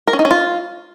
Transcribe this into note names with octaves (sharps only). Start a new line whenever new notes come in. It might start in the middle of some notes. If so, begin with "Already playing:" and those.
A#4
C#4
D#4
C#4
F4